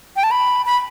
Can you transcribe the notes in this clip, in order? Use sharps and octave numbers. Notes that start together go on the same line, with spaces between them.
G5
A5
B5
B5